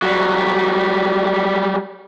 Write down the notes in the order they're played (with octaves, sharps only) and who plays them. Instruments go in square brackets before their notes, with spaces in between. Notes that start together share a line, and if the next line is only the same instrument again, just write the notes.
[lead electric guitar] F#3 G3